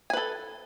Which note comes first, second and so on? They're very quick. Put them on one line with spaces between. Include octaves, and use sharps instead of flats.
G#5 B4 A4